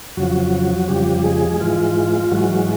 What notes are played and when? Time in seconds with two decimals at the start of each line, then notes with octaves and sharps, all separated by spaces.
0.17 F2 C#3 F3 F#3 F#4
0.88 F2 C#3 F3 G3 G4
1.24 G#3 G#4
1.60 G#2 E3 G#3 F4
2.32 G#2 E3 F#3 G#3 F#4